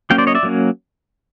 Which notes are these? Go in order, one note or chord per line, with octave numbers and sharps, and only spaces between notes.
F#3 A#3 C#4 F5 G5
C5 D5
C#5 D#5
D5 E5
F#3 A#3 C#4